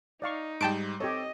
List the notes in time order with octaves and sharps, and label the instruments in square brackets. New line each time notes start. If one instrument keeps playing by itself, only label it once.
[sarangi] D#4 [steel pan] D5 F5 C#6
[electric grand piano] G#2 G3 [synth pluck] G5 A5 D7
[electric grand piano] C4 A4 [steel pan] G4 C#5 [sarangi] D#5